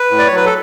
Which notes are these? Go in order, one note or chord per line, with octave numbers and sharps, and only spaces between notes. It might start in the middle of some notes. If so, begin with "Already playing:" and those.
Already playing: B4
A2
D5
C#5
F#3
B4
A4